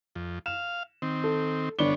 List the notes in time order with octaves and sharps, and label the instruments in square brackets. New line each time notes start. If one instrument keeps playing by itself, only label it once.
[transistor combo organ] F2
[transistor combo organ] F5 [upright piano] E7
[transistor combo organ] D#3 C4
[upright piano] A4
[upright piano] G1 D5 G7 [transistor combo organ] B3 D4 C#5